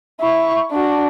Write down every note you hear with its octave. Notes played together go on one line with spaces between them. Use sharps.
E4 C#6
D4 F#4